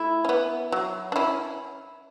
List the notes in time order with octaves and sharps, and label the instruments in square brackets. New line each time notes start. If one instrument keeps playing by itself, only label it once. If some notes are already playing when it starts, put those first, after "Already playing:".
Already playing: [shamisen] A3 [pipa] E4
[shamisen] C#4
B3
F#3
D4
C#4 E4